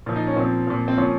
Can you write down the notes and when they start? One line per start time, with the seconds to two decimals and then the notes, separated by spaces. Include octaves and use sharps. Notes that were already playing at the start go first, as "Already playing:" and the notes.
0.06 A#2 F3
0.16 D#4
0.27 C#4
0.36 A#2 F3 C4
0.67 A#2 F3
0.88 C4
0.97 A#2 F3 C#4